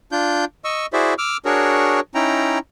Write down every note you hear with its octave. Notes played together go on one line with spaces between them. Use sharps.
D4 F4 G6
D#5 C#6 E6
E4 F#4 G#4 C5 D5 E5
D6 E6 F6
D4 F#4 G#4 A#4 C#5
C#4 D#4 E4 G5 A#5